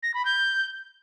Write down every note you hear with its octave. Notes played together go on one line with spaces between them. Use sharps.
A#6
B5
G6